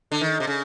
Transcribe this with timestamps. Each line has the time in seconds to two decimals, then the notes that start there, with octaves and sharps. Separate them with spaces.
0.12 D3
0.21 D#3
0.40 C3
0.47 C#3